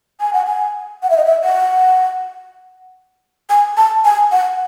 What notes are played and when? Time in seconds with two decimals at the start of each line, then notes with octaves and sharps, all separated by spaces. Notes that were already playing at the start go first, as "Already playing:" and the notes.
0.21 G#5
0.33 F#5
0.46 G#5
1.03 F#5
1.10 E5
1.17 D#5
1.25 E5
1.44 F#5
3.50 G#5
3.77 A5
4.05 G#5
4.32 F#5